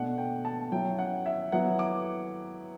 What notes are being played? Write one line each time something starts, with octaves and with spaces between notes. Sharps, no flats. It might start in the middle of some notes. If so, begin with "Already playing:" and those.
Already playing: B2 A3 D4 F#5
G5
A5
F#3 C#4 E4 G5
F#5
E5
F#3 B3 E4 F#5
D6